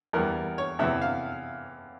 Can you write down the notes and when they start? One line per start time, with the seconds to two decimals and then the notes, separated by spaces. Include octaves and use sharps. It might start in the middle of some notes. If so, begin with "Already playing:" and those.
0.13 E2 E3 G3 A#4
0.58 C#5
0.79 E2 C3 E3 E5
1.02 F5